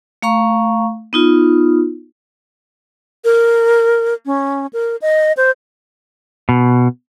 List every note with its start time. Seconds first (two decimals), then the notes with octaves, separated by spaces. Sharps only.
0.22 A3 F5 A#5 C#6
1.13 B3 D#4 F4
3.25 A#4
4.26 C#4
4.73 A#4
5.02 D#5
5.37 C5
6.49 B2